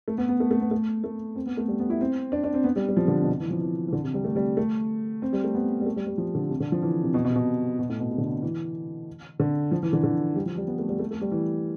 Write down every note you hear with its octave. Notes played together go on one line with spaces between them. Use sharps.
A3
B3
B3
A3
A3
B3
A3
A3
C4
B3
A3
G3
B3
E4
C4
D4
D4
C4
B3
G3
G3
F3
D3
B2
C3
E3
F3
E3
E3
D3
C3
G3
A3
G3
A3
C4
G3
A3
B3
G3
A3
G3
G3
F3
D3
C3
D3
F3
E3
C3
B2
B2
C3
B2
B2
A2
B2
C3
D3
C3
E3
D3
F3
E3
D3
D3
G3
F3
G3
B3
A3
G3
A3
A3
G3
E3